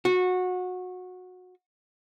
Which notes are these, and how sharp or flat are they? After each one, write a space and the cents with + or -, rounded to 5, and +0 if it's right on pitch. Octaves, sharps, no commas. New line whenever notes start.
F#4 -20